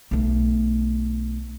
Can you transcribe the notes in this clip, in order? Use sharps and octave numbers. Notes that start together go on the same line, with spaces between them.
B1 A3